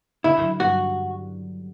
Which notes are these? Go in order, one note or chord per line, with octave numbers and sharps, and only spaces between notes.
D3 E4
F#3
G2 F#4